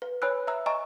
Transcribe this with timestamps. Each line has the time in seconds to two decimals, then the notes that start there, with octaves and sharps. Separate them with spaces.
0.02 B4
0.22 B4 C#5 G#5 B5 E6 F#6
0.47 E5 A#5 E6
0.66 D#5 G#5 A#5 C#6